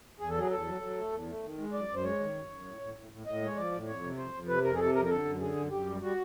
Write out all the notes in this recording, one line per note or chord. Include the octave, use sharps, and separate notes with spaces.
E2 G#4
A4
F#3 G#4
E2 A4
F#3
F#3
A3
E2
A3
D#3
G#3
F#2 D5
F#2
C5
G#3 C#5
D#3
F#2
F#2
A2
A2
A2
A2
A2 D#5
G#3 C#5
F3 D5
A2
F2 C#5
C3
F2 C5
F2
C3 B4
F2 A#4
G#4
C3 A4
F2 A#4
A#4
D3 A4
F#2
D3 G#4
F#2
F#2 G4
G3
G3 F#4